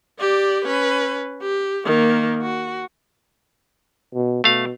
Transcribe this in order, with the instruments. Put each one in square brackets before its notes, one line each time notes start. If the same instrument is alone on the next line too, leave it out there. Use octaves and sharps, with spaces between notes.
[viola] G4 D5
C#4 B4
G4
D#3 A#3
F#4
[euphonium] B2
[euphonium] B2 [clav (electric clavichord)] A3 F5